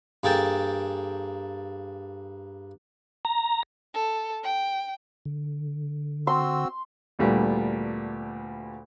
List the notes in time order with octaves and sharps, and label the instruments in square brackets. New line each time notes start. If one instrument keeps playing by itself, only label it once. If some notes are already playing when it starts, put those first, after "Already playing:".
[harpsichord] G2 A#3 G#4 A4 G5 A5
[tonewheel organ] A#5
[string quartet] A4
G5
[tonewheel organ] D3
[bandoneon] C4 F#4 E6 [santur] C6
[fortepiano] D2 A#2 G3 A3 B3